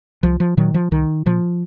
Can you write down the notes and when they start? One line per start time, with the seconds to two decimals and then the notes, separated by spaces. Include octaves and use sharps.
0.23 C2 F3
0.40 F3
0.57 A#2 D#3 F#3
0.74 F3
0.91 C2 D#3
1.26 A#2 F3